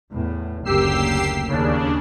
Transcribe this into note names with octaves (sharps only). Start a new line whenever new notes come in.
E2 A2
F#1 D2 A#3 G4 E6 C7
D#2 C#3 D4